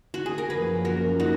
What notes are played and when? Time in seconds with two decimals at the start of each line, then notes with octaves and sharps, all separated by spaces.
0.14 F#4
0.26 G#4
0.38 A#4
0.50 F#2 F3 A#3 C#4 F4 G#4 B4
0.85 F#4 A#4
1.20 D#4 F#4